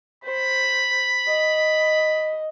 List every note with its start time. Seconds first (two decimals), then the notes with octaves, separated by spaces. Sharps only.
0.24 C5 B5
1.27 D#5